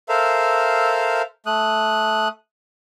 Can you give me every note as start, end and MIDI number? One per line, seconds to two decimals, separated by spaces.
0.09 1.22 69
0.09 1.22 70
0.09 1.22 72
0.09 1.22 76
0.09 1.22 77
1.46 2.28 57
1.46 2.28 87
1.46 2.28 90